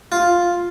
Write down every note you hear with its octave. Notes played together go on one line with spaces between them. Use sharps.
F4